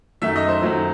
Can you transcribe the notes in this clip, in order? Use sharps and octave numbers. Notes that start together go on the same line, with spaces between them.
F#2 D#3 F#3 A3 E5
D#5
C5
F#2 D#3 F#3 A3